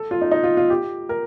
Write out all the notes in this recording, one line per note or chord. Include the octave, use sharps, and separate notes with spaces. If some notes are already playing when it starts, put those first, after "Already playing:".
Already playing: A4
F4
D#4
D#4
F4
F4
G4
A#4